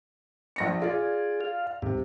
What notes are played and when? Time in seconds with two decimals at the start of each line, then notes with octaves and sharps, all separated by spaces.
0.56 A#1 A#6 C#7
0.82 F4 G#4 D5
1.41 F5
1.82 D#2 G#2 C3